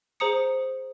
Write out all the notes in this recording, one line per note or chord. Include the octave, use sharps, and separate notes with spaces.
G#4 C5 A#5 D#6 C#7